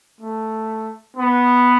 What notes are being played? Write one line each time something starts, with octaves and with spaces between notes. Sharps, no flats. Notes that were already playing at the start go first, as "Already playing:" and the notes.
A3
B3